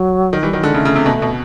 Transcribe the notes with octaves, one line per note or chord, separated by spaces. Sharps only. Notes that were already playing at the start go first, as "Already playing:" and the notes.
Already playing: F#3
D#3
E3 G3
D#3 F#3
D3 G#3
C#3 A3
C#3
C3
B2
B2